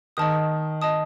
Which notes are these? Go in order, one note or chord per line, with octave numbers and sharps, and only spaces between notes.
D#3 D#5 A5 D#6
D#5 A5 D#6